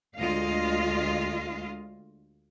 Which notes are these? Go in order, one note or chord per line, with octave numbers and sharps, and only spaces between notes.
D2 G#3 F4 D#5 F5